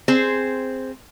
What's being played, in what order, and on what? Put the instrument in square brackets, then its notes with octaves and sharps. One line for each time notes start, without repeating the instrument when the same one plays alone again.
[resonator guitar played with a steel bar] C4 G#4 C5